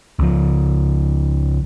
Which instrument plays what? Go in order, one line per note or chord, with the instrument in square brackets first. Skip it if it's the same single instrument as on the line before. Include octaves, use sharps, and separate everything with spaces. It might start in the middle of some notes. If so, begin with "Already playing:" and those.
[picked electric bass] C#2 F3